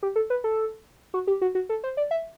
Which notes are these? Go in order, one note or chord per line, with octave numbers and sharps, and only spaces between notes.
G4
A4
B4
A4
F#4
G4
F#4
F#4
A4
C5
D5
E5